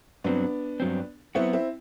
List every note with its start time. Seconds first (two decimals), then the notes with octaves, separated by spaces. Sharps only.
0.24 G2 F#3 B3 C4 D4
0.80 G2 F#3 C4
1.35 F#3 B3 C4 E4 F#4
1.53 C4 E4